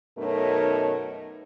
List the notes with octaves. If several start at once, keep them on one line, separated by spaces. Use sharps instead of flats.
F#2 B2 A3 D#4 A#4 C#5